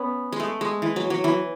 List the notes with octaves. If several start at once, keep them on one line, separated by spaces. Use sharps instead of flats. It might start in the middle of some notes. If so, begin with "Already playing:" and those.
Already playing: B3 C#4
G#3
A3
G#3
E3
F#3
F#3
E3